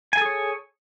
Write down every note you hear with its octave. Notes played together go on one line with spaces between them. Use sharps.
G#4 A4 C#5 G#5